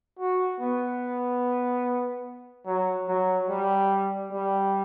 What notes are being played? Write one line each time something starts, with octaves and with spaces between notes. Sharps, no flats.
F#4
B3
F#3
F#3
G3
G3